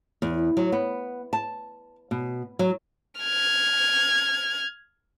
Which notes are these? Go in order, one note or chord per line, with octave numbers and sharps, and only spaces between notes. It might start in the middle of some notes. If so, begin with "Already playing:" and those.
E2
F#3
B3
A5
B2
F#3
F6 G#6